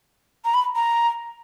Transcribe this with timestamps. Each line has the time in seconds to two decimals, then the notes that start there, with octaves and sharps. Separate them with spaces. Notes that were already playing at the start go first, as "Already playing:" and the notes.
0.45 A#5
0.54 B5
0.76 A#5